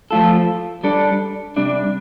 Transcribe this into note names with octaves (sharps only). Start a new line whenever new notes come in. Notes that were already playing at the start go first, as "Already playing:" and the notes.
F3 A3 F4 A4
G3 D4 A4
C3 G3 D4